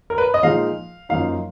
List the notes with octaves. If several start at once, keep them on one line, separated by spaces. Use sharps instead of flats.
A#4
B4
D#5
A#2 F3 G#3 D#4 F5
F#2 F3 A#3 D#4 F5